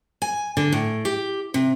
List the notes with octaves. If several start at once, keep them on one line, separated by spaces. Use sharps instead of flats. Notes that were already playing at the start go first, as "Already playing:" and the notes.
G#5
D3
A2
G4
C3